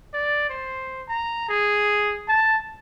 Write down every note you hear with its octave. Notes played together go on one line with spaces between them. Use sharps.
D5
C5
A#5
G#4
A5